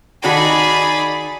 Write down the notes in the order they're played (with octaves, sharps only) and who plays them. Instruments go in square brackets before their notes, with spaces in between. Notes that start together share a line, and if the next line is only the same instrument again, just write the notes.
[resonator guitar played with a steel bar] D#3 F#4 A4 [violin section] D#4 B5 [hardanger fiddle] G#4 D5